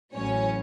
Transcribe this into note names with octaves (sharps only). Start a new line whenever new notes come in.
A1 A2 F#3 C#4 C#5